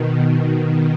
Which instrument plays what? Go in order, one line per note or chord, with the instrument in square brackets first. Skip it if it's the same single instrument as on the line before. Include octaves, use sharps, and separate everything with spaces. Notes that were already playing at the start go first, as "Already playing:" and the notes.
Already playing: [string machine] B2 D#3